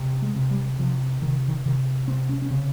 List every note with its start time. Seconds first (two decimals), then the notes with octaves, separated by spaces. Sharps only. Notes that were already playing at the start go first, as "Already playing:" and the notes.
Already playing: C3
0.22 G#3
0.36 C3
0.51 G3
0.79 C3 F3
1.22 C3 D#3
1.48 D#3
1.66 C3 D#3
2.08 C3 C4
2.29 C#4
2.42 C#4
2.51 C#3 C4